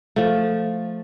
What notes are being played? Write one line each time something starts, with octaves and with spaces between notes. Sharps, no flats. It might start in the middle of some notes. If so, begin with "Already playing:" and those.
F3 A3